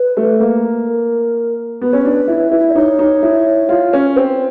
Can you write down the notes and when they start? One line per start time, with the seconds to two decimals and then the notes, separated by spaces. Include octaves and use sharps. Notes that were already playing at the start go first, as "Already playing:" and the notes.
Already playing: B4
0.17 A3
0.40 A#3
0.87 A#4
1.81 B3 B4
1.93 C#4
2.05 D4
2.28 E4
2.51 E4
2.69 D5
2.75 D#4 C#5
2.99 D#4
3.23 E4
3.69 F4
3.93 C#4
4.16 C4